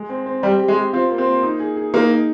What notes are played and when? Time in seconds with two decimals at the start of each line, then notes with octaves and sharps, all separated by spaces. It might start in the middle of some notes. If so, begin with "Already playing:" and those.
Already playing: G#3
0.09 C4
0.26 C4
0.43 G3 G4
0.59 G4
0.68 G#3
0.77 G4
0.93 C4 F4
1.10 A#3
1.18 C4
1.27 A#3
1.43 D#4
1.60 G#4
1.77 G#4
1.94 A#3 D#4
2.10 D#4